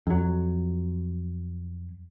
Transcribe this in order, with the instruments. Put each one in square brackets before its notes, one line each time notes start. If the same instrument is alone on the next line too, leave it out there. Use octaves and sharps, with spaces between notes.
[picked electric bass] F2 F#3